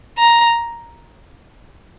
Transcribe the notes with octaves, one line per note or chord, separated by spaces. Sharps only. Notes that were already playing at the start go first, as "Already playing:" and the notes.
A#5